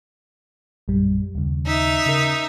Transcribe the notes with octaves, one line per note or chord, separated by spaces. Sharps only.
A#1 F#2 G3
D#2 C#3
D#4 E5
C#3 A#4